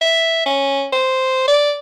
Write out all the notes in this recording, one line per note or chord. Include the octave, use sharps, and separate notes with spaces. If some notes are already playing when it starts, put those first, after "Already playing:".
E5
C#4
C5
D5